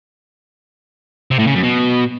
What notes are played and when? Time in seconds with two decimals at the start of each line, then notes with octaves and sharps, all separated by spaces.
1.31 C3
1.39 A2
1.47 C#3
1.55 F#2
1.63 B2